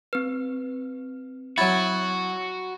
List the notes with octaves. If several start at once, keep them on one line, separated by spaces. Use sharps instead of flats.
C4 B4 F6
F#3 E4 F#4 B5 G#6 A6